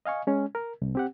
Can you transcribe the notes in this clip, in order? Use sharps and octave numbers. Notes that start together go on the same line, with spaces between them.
D#5 F5 G#5 C#6
G#3 C#4
A#4
C2
C4 G4 F#5